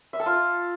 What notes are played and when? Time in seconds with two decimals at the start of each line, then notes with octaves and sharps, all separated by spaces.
0.13 E5
0.20 A4
0.26 F4